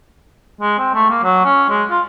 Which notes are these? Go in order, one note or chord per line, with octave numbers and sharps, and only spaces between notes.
G#3
C4
A3
A#3
F#3
C#4
G#3
F4